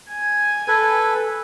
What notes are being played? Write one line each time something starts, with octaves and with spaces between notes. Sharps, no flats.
G#5
A4 B4